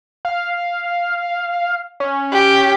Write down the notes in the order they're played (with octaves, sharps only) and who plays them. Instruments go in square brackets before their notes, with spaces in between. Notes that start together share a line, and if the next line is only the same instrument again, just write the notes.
[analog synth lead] F5
C#4
[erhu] G4